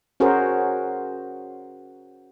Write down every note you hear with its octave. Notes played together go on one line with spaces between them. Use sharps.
C#4 F#4 G#4 A#4 C5